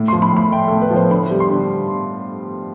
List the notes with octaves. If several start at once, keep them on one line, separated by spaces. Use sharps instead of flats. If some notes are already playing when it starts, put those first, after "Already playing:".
Already playing: A2
C6
F3
B5
A2 B5
A3 G5
A4
A2
B4
F3
C5
D3 B5
G3
C6
D3